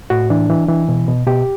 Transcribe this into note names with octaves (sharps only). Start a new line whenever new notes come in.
A2 F#4
E3 D4
E3
E3
B2
B2
B2 G4